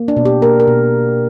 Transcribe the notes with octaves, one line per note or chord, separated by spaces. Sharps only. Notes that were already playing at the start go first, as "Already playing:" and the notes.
Already playing: A#3
D4
B2
G4
A#3 A#4
A#4
B2